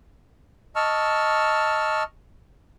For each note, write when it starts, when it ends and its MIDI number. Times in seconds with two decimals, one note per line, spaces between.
0.76 2.03 75
0.76 2.03 81
0.76 2.03 85
0.76 2.03 88
0.76 2.03 89